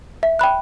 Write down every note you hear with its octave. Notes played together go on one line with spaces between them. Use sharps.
E5
G5 B5 F#6